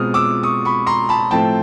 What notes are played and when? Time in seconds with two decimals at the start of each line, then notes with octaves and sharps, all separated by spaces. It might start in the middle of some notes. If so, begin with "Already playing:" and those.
Already playing: B2 G#3 C4 F4 D#6 F6
0.14 D6 E6
0.43 C#6 D#6
0.65 B5 C#6
0.87 A#5 C6
1.09 A5 B5
1.31 A2 F3 A3 C4 G5 A5